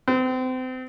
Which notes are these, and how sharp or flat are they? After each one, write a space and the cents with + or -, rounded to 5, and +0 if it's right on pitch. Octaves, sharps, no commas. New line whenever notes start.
C4 -30